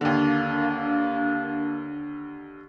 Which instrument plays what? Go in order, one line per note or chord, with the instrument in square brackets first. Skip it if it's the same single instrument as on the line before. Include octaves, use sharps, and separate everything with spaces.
[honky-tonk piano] D#2 D3 [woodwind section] A#3 D4